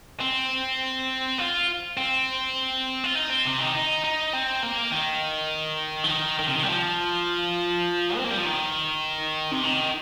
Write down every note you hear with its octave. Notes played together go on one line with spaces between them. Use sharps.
C4
F4
C4
F4
D#4
C4
C3
D#3
D#4
D#4
C4
A#3
D#3
F3
D#3
D#3
C3
D#3
G3
F3
C4
A#3
G3
F3
D#3
C3
D#3